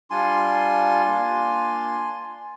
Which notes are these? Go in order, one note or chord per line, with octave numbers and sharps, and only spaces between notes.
G3 D4 F4 G#5 C6
A#3 D4 F4